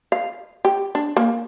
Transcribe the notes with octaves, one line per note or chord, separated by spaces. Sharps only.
F5
G4
D4
A#3